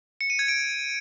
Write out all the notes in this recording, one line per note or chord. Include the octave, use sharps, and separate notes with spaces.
C#7
D#7
G#6
D7